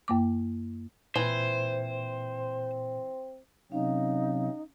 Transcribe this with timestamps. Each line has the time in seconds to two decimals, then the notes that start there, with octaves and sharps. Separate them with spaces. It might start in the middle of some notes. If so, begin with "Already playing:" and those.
0.08 F#2 A#3 D6
1.16 A#2 E3 C4 C5
3.72 C3 F#3 C4 C#4 D#4 F5